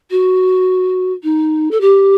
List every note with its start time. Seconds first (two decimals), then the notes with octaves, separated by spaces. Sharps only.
0.11 F#4
1.23 D#4
1.71 A4
1.81 G4